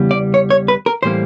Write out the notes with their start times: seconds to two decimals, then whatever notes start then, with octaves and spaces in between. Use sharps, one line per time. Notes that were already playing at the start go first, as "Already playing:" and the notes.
Already playing: E2 C#3 E3 G3 B3
0.11 D5
0.34 C#5
0.50 C#5
0.68 B4
0.86 A#4
1.03 A2 E3 G3 A#3 C5